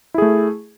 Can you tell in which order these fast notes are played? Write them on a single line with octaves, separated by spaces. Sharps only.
E4 G#4 A3